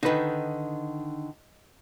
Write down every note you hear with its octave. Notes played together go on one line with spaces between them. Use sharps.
D3 D#3 D#4 B4